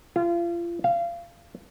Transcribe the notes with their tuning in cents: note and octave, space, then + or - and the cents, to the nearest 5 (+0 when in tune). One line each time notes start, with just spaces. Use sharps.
F4 -30
F5 -25